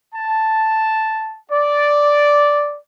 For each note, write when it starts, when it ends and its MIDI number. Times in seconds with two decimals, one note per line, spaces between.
0.14 1.37 81
1.51 2.80 74